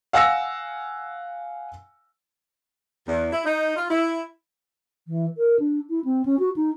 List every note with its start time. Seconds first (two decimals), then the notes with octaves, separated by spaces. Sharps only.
0.13 F5 F#5 G#5 E6 A#6 C#7
3.07 E2
3.32 E4
3.45 D#4
3.76 F4
3.90 E4
5.08 E3
5.37 A#4
5.60 D4
5.90 E4
6.05 C4
6.25 C#4
6.39 F#4
6.56 D#4